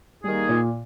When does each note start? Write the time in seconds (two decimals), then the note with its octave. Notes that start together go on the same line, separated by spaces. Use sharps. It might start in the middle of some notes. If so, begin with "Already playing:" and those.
0.23 D#3 G3 A#3 D#4 G#4
0.49 A#2